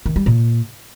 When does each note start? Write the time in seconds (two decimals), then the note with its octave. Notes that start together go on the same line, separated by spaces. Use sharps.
0.06 D#3
0.16 G3
0.26 A#2